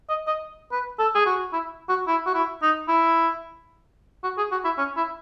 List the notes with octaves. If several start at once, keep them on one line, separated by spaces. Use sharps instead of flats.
D#5
D#5
B4
A4
G#4
F#4
E4
F#4
E4
F#4
E4
D#4
E4
F#4
G#4
F#4
E4
C#4
E4